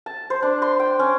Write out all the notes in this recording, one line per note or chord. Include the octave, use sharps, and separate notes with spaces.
A5
C5
D4
C6
G5
C#4